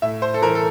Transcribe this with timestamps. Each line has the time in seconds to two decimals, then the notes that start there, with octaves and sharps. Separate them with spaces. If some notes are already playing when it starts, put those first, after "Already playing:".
0.02 A2 E5
0.22 C5
0.34 A4
0.42 E3 A#4
0.55 A4